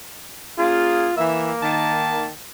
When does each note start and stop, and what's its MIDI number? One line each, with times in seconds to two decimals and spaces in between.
0.58 1.09 58
0.58 1.09 61
0.58 1.13 65
0.58 1.09 68
1.17 1.51 52
1.17 2.26 58
1.17 1.51 76
1.62 2.29 51
1.62 2.29 81